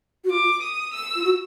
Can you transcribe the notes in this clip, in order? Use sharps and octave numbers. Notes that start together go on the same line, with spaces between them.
F#4
F4 D6
D#6
E6
F4
F#4